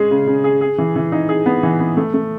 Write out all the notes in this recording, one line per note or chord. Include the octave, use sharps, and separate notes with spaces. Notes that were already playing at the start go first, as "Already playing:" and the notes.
Already playing: G#3 C#4 G#4
C#3
C#3
G#4
G#4
E3
E3
D#4
G#4
B3
E3
B3
A3
A3